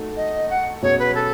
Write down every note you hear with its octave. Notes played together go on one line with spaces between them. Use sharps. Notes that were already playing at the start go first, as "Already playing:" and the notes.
Already playing: A3 D#4 F#4 A4
D#5
F#5
B2 F#3 C#4 G#4 C#5
B4
A4